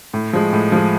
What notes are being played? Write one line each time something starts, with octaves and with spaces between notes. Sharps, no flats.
A2
F3 G#3
A2
F3 G#3